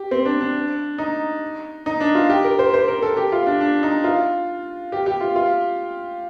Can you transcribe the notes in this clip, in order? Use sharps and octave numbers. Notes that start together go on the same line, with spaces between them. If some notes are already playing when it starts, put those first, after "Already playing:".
Already playing: G4
C4
D4
D4
D#4
D#4
D4
F4
G4
A#4
C5
C5
A#4
A4
G4
F4
D4
D4
D#4
F4
G4
G4
F4
F4